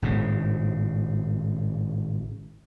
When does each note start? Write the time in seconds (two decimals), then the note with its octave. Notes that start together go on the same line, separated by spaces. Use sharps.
0.02 G#1 A2 C#3